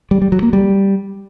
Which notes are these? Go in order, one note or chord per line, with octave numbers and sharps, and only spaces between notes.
G3
G3
F#3
A#3
G3